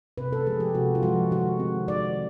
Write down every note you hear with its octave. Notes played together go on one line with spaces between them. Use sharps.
C3 B4
A4
F3 G#3 G#4
G4
C3 F#4
F4
F3 G#3 F#4
D#3 F#4
G#3 C4
D#3 D5